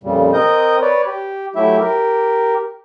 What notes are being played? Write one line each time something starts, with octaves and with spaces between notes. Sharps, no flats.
F2 A#2 C#3 G3
C4 A#4 D#5 D#6 G6
B4 C#5 D5
G4
F#3 A3 E4 G4 E5
G4 A#4